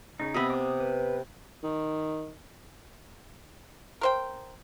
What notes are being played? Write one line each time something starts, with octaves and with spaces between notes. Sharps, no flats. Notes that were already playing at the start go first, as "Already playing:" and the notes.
C#3 D#4
C3 B3 D#5 E5 B5
D6 D#6
B4
D#3
A#4 C5 G5